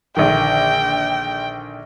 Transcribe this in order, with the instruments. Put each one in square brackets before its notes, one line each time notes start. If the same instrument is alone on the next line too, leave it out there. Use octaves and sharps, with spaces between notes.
[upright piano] A#1 D3 D#3 [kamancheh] G5